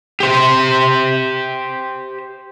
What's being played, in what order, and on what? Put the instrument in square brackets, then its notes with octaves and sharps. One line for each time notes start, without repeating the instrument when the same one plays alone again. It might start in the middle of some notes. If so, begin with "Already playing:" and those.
[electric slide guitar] G4 C5